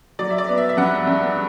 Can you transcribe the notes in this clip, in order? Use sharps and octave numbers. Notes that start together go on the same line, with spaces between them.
F#3 D5
E5
D5
B3
E5
E5
G2 F#5
G2